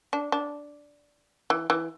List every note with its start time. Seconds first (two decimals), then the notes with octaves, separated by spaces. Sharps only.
0.13 D4
0.32 D4
1.50 E3
1.70 E3